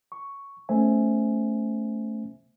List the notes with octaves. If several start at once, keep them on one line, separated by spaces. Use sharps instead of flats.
C#6
A3 B3 C#4 C5 E5 G#5